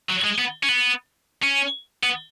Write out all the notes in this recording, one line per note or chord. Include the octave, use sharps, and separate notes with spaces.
F#3
G#3
B3
C#4
B3
C#4
B3